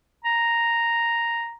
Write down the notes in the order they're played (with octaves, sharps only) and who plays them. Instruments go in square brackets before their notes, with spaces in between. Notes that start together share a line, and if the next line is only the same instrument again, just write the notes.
[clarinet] A#5